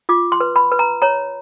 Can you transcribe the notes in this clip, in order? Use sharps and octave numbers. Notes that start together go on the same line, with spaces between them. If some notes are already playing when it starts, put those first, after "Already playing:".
F4 D6
C6
B4
B5
B4
A#5
C#5 A#5